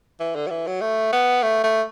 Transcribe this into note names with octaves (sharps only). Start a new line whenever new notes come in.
E3
D3
F#3
E3
F#3
A3
B3
A3
A3